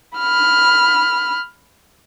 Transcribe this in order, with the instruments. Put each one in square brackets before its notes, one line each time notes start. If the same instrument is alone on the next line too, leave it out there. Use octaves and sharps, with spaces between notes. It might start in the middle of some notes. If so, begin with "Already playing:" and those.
[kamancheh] B5 F6